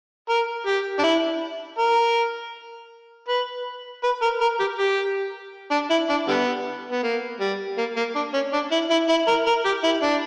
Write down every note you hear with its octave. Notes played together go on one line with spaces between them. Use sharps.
A#4
G4
D4
E4
A#4
B4
B4
A#4
A#4
G4
G4
D4
E4
D4
D3 G3 B3
B3
A#3
G3
A#3
A#3
D4
C#4
D4
E4
E4
E4
A#4
A#4
G4
E4
D4